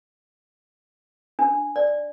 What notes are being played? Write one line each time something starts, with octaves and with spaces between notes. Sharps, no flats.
D4
D5